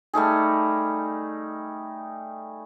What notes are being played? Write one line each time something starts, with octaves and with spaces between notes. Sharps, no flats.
G3 A3 D#4 G#4